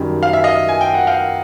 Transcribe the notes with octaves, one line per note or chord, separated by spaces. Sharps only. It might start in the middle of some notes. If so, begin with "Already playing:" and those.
Already playing: F#2 D#3 G3
F5
E5
D#5 F5
G#5
G5
F#5
F5 G5